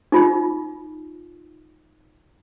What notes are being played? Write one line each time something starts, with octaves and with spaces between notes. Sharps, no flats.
D#4 F4